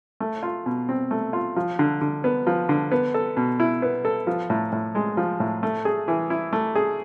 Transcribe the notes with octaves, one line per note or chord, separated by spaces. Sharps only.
A3
F4
B2
C4
A3
F4
F3
D3
D3
B3
F3
D3
B3
A4
B2
E4
B3
A4
F3
A2
A2
G#3
F3
A2
A3
G#4
E3
E4
A3
G#4